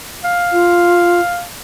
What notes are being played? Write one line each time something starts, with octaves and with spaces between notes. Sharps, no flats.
F5
F4